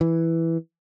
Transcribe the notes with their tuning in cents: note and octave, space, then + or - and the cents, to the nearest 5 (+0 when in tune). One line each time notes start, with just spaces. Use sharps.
E3 +0